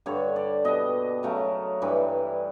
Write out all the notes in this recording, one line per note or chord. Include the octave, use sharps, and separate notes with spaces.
G2 D3 G3 C#5
D5
B2 G3 D#5
C#3 F#3 A3 A#4
G2 E3 G3